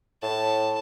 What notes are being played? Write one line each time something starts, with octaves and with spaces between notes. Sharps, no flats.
A2 A5